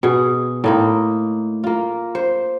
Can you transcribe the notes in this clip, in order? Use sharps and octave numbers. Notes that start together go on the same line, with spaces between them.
B2 G#4
A2 A#3 D#4
A#3 F4
C5